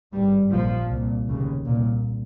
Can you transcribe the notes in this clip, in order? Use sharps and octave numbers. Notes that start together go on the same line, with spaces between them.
G#1 G2 G3
A#1 A#2 F3
C2 A#2
F1 D#2 C#3
C2 A#2